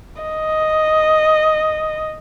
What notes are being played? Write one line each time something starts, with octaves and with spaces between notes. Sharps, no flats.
D#5